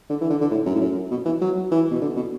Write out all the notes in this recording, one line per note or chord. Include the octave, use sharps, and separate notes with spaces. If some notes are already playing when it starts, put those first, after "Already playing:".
D3
E3
D3
D3
A2
F#2
A2
F#2
B2
E3
F#3
E3
B2
D3
B2